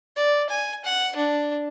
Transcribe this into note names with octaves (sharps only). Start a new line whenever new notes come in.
D5
G#5
F#5
D4